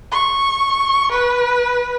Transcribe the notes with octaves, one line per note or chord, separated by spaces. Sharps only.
C#6
B4